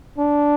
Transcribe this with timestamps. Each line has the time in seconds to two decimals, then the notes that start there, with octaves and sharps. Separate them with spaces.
0.18 D4